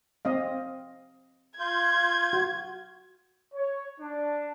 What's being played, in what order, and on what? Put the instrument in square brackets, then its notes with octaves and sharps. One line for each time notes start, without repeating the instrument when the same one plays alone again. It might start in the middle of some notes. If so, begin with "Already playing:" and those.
[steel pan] C4 D#5 F5
[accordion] F4 G6 [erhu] G#6
[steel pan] F#4
[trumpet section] C#5
D4